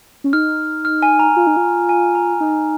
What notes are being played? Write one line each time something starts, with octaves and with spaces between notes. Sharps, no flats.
C#4
D#4 F6
F6
G#5
A#5
F4
D#4
F4
G#5
A#5
D#4